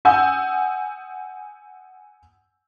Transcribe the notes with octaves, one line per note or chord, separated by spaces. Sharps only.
F#5 G#5 D#6 E6 G6